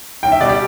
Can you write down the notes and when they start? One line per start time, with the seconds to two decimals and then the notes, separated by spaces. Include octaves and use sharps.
0.23 B1 G5
0.32 E5
0.40 B2 G3 D5
0.49 G4